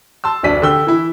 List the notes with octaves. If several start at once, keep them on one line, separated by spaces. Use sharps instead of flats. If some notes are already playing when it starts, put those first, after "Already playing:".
A5 C6 E6
F1 D2 D4 B6 D#7
D3 G4 E6 G7
E3 E4